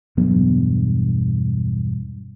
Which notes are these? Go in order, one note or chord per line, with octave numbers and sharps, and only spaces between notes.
E1 G2 F#3 B3